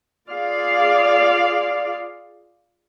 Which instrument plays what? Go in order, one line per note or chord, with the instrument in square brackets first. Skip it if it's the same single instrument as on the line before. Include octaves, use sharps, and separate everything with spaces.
[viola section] F4 G#4 D5 F5